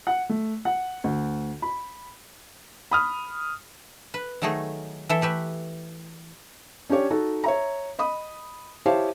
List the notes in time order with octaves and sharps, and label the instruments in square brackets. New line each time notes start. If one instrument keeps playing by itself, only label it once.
[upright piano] F#5
A3
F#5
D2
B5
[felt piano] B5 D#6 F6
[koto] B4
D#3 F#3 A3 D#4 G#4
E3 A4 E5
A3 G4 B4 E5
[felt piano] C#4 D4 G4 C#5
D#4 F#4 A4
C#5 E5 A#5
D#5 B5 D#6
E4 G4 C5 C#5 F5 A5